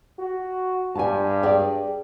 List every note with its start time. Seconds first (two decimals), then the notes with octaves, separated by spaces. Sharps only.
0.19 F#4
0.95 G2 G#5 A5
1.43 G#4 D5 G5